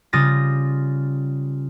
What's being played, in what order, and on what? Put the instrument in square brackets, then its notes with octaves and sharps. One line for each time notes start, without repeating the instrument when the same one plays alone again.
[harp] C#3 G3 F4 D#6 A6 A#6